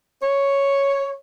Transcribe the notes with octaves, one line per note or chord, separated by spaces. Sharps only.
C#5